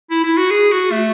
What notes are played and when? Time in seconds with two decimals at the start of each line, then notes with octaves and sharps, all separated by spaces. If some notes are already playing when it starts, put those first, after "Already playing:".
0.11 E4
0.23 E4
0.37 F#4
0.51 G#4
0.72 F#4
0.92 A3